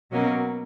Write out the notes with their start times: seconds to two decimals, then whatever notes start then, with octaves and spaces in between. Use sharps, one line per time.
0.11 B2 F#3 A#3 C#4